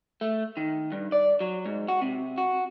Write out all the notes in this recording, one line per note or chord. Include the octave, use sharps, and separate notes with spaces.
A3
D#3
G2
D5
F#3
G#2
F#4
C3
F#4